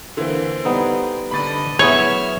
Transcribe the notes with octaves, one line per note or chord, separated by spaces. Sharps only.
D3 E3 A#3 C4
G3 B3 D#4
D3 D#5 B5 A6
F#3 B3 E4 G#4 C#5 E5 F6